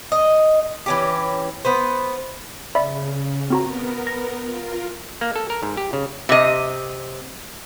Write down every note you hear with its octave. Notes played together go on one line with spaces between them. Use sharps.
D#5
E3 C#4 G4
B3 B4 C5
C#3 D5 E5 B5
B3 C4 F#4 A#4 A#5
A#6
F4 A#4
A#3
A4
A#4
G#2
G4
C#3
C3 D#5